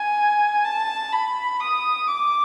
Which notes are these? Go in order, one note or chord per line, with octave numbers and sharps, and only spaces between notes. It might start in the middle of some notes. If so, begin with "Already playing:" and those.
Already playing: G#5
A5
B5
D#6
D6